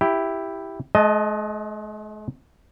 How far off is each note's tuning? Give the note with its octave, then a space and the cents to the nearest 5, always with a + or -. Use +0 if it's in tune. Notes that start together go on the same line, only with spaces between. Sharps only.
E4 +0 G4 +0
G#3 +45 D#5 +0 A5 +0